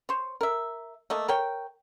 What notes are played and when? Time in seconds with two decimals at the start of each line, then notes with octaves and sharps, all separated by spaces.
0.09 C5 C#5
0.41 A#4 E5
1.10 A3 A#3 D#5
1.28 A#4 C#5 G5